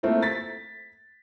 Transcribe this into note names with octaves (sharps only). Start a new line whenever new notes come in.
A3 A#3 C4 E4 F4
A6 B6